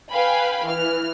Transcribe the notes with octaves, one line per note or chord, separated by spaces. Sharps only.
B4 F5 G5 G#5 B5
E3 F6